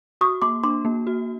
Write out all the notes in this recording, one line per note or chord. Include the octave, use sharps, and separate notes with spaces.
F#4 C#6 D#6
A#3 C6 D6
D4 C6 D6
A#3
F#4